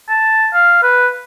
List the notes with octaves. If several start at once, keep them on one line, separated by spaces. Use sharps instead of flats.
A5
F5
B4